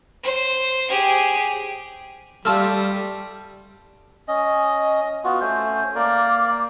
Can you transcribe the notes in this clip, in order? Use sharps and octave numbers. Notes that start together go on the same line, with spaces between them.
C5
G4 G#4
G3 A3 F4 A5 E6 F6
C#4 D#5
B3 F4 F#4
A3 C#4 C5
A#3 A#4 D5